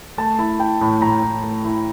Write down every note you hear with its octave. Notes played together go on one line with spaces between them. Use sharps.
A3 A5
E4
E4 G5
A2
A2 A#5
A2
A3
E4